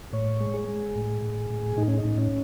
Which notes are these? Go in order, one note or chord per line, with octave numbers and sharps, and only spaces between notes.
A2 C#5
G#3
G#4
G#3
A2
A2
A2
A2 D#4
C#4
D#4
A2
C#4